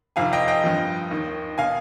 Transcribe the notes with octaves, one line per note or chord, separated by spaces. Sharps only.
F2 C3 D#3 F5 G#5
D#5 G5
D#5 G5
G2 F3
D#2 D#3
B2 F5 G#5